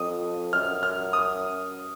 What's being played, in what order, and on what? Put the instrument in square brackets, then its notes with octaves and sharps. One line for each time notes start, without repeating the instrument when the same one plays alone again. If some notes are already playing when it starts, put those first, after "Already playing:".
Already playing: [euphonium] F2 [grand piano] D#6
[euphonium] F#2 [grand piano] F6
[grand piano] F6
D#6